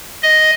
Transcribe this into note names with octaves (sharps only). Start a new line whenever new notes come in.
D#5